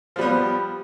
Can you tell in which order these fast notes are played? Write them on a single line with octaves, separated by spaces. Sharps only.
F3 G3 B3